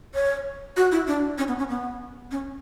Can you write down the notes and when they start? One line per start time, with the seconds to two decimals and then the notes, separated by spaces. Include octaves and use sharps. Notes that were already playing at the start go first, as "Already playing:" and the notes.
0.15 C#5
0.77 F#4
0.92 E4
1.07 D4
1.38 C#4
1.48 B3
1.59 C#4
1.69 B3
2.31 C#4